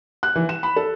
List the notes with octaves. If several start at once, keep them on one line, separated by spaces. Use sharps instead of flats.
F#6
E3
E7
B5
A4